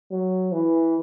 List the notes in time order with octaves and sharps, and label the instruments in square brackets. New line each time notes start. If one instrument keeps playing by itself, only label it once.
[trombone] F#3
E3